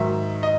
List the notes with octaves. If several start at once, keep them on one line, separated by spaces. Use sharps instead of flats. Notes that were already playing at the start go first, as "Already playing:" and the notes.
Already playing: G#2 D#3 F#3 E5
D#5